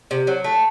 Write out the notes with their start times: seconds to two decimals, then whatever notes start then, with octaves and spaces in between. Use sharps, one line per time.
0.11 C3
0.27 F#3
0.44 A3